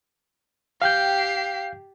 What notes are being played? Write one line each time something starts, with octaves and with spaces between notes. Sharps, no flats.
G4 F5 G5 G6 C7